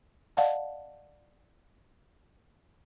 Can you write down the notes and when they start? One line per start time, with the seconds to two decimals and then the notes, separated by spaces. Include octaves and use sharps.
0.37 D5 D#5 F5 F#5 A5